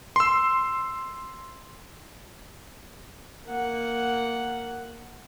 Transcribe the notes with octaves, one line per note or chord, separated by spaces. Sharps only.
C6 E6
A#3 F#5